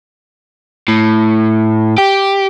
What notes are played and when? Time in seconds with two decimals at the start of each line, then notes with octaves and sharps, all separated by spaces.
0.88 A2
1.98 G4